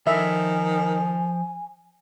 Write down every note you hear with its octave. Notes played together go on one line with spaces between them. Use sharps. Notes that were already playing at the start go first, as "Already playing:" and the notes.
D#3 F3 E5 G#5 B5